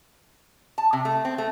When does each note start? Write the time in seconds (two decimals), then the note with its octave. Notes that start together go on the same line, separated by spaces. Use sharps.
0.78 A5
0.93 C3
1.05 A3
1.25 C4
1.38 A3